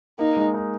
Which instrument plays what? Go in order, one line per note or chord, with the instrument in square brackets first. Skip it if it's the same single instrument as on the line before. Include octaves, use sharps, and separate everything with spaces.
[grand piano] A#3 [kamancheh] D#4
[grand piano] G#3
D#4